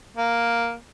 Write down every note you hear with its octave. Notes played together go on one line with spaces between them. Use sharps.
A#3